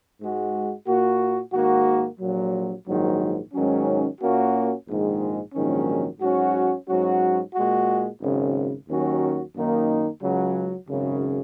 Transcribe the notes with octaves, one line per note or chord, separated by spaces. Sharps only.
G#2 G#3 F#4
A#2 A#3 F#4
G#2 D#3 A#3 F#4
A#1 A#2 F#3
A#1 G#2 D#3 F#3
G#2 D#3 F#3 C#4
A#2 A#3 C#4 F#4
A#1 G#2 D#3 G#3
A#1 G#2 D#3 F#3 C#4
G#2 F#3 C#4 F#4
G#2 F#3 C#4 F#4
A#2 G#3 F#4
G#1 F#2 C#3
D#2 D#3 F#3 C#4 F#4
F#2 D#3 A#3 D#4
C#2 C#3 F#3
G#1 F#2 C#3